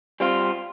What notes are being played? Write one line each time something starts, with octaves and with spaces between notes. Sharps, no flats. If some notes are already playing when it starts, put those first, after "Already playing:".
G3 C4 F4